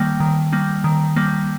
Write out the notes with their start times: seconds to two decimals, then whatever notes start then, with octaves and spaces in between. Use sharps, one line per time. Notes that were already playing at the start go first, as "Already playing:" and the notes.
Already playing: D#3 G3 A#3 G5
0.20 D#3
0.53 G3 A#3
0.84 D#3
1.16 G3 A#3